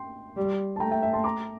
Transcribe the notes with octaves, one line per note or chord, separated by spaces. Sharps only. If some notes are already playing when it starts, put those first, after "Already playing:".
Already playing: G5 C6
G3
A5
A3 G5 A#5
E5 G5
E5
A5 C6
A#5 D6